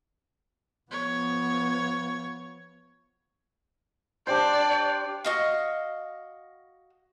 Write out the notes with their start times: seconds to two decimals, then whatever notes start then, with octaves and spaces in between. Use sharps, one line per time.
0.91 F3 B3 C#5
4.27 D4 G4 C5 D5
5.24 F#4 D#5 F5